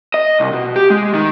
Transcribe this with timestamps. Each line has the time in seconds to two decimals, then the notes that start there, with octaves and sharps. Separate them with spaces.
0.14 D#5
0.40 C2
0.53 B2
0.76 G4
0.90 G#3
1.14 D#3